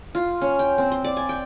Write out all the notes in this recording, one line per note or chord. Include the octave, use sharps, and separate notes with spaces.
F4
C#4
G5
C4
C6
D5
G#5
G5